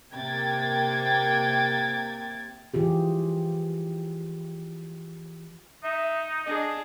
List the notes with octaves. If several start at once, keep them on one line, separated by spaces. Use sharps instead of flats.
C3 A#3 G5 G#6 A6
E3 F4 G4 G#4
D#4 E5
D4 G#4 D#5